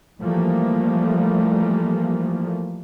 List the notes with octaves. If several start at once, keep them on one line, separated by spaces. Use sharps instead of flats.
E3 F3 G3 A3 A#3